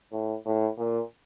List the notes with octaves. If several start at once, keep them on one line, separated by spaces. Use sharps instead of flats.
A2
A2
A#2